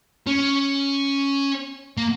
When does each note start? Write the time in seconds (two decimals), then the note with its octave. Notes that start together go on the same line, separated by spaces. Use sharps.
0.27 C#4
1.98 A#3